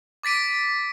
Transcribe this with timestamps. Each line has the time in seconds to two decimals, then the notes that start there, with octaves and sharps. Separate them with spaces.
0.23 D6 A6 B6 D7 D#7